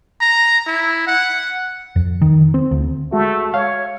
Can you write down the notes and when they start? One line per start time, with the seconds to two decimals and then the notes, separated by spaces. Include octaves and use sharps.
0.21 A#5
0.67 E4
1.07 F#5
1.96 F2
2.22 D#3
2.54 C4
2.71 D2
3.12 G#3 A3 F#4
3.54 C#5 F5